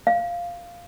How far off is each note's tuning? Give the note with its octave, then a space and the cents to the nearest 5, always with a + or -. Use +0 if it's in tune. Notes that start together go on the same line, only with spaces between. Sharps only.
F5 -5